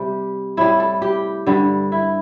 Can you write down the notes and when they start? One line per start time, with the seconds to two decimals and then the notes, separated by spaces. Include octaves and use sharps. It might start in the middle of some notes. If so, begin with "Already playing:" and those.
Already playing: C3 G3 G4
0.57 A2 G3 E4
0.80 A4
1.02 G4
1.47 G2 D3 G3
1.92 E4